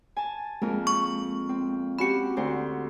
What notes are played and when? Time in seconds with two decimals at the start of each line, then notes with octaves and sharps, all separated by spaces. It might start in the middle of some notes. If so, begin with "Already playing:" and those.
0.17 G#5 A5
0.62 F2 G#3 A#3 A#4
0.87 C#6
1.49 C4
1.99 C#4 F#4 G4 B5 C#7
2.37 D2 C5